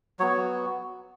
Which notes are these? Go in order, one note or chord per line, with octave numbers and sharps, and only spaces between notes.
F#3 B3 F#4 C#5